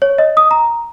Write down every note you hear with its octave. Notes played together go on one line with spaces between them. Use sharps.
C#5
D#5
D#6
A#5